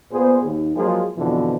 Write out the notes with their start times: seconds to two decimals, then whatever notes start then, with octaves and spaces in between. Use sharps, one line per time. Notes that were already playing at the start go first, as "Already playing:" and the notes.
0.11 A#2 B3 G#4 C5
0.43 D#2
0.76 F3 F#3 G#3 A#3 F4 G#4
1.16 F2 B2 D3 E3 F3